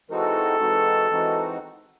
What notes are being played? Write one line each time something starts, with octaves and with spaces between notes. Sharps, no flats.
E3 G#3 C4 D#4 F#4 A4
E3 G#3 C4 D#4 F#4
E3 G#3 C4 D#4 F#4